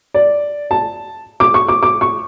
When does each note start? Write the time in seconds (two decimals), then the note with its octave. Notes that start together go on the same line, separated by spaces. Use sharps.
0.14 D5
0.71 A5
1.40 D6
1.54 C#6
1.69 D6
1.83 D6
2.01 C#6